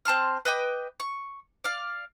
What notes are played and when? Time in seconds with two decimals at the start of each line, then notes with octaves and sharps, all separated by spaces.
0.05 C4 A5 C6 F6
0.45 B4 D#5 G5 D6
1.00 C#6
1.64 D5 F5